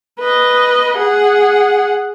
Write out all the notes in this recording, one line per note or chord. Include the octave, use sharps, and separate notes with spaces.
B4 D#5
G#4 F#5